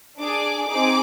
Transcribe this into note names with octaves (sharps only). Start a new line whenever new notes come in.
D4 G#4 D6
C4 D#4 G#4 D6